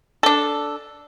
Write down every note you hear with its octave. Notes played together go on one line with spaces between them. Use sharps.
D4 A4